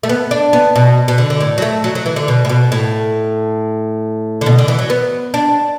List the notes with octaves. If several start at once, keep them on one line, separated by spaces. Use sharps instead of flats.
A3
B3
D4
B3
B2
B2
D3
D3
A2
F#3
A3
F#3
F#3
E3
D3
B2
A2
B2
A2
D3
B2
D3
E3
F#3
B3
D4